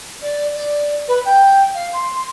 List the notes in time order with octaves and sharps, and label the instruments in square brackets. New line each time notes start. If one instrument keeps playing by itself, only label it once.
[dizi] D5
D5
B4
G5
F5
C6